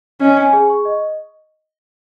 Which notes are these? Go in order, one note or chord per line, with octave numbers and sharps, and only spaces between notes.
C#4 D#5
G#5
G#4
C#6
D#5